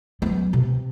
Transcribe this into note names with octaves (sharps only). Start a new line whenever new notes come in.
F#3 B3
C3